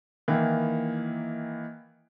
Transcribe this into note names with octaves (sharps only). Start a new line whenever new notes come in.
D#3 E3 A#3 E4